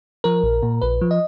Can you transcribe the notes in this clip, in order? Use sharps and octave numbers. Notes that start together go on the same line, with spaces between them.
F3 A#4
A#1
A#2
A#1 B4
F3
D#5